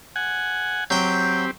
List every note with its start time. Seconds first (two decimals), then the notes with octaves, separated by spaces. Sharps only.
0.16 F#5 G#5
0.90 F#3 C4 G4 G5